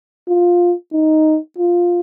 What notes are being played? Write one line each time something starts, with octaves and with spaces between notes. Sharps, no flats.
F4
D#4
F4